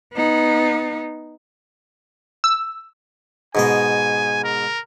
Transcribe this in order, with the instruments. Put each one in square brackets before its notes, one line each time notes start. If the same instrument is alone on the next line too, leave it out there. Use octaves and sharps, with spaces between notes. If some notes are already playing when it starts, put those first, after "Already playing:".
[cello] B3 D#4
[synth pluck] E6
[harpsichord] G#2 B2 D#5 [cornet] G#5
[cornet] A#4